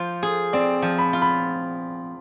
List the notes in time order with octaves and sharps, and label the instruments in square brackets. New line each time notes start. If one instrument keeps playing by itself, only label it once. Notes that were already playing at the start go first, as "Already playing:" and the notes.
Already playing: [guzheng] F3 F4 [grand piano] C5
[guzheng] G#4
[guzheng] C4 [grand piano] D5
[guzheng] F3
[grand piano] B5
[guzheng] F4
[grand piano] B5